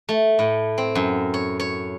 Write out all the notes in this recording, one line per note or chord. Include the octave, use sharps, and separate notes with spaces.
A3
A2
C4
F#2
C#5
C#5